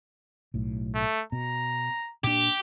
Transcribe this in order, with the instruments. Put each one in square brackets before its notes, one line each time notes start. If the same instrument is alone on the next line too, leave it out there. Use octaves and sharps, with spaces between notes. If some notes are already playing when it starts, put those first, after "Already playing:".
[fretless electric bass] B1 A2
[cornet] A3
[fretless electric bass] B2 [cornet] A#5
[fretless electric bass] A#2 D4 [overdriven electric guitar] G4